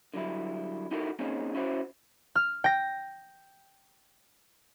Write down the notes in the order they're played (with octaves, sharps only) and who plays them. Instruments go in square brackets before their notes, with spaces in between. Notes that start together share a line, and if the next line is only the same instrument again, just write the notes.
[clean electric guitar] D3 F#3 G3 E4
D#4 E4 F#4 G4 A4 A#4
A#3 C4 C#4 D#4 G#4
C#4 E4 F#4 C5
[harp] F6
G5 A#6